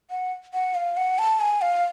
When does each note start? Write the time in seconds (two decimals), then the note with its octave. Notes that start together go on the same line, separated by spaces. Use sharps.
0.11 F#5
0.54 F#5
0.75 F5
0.97 F#5
1.19 A5
1.40 G#5
1.62 F5